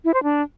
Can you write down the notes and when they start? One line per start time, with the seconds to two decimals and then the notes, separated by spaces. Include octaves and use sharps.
0.04 E4
0.14 C5
0.23 D4